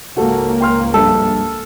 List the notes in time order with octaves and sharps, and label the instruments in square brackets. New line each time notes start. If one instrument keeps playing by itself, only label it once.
[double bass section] C#2 G#2 A#3 [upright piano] F#4 A4
[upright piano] G5 C6 F6
[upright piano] A#1 G2 [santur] A4